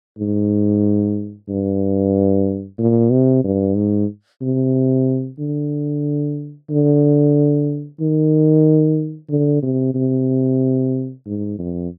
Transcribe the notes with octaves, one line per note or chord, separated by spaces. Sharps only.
G#2
G2
A#2
C3
G2
G#2
C3
D3
D3
D#3
D3
C3
C3
G#2
F2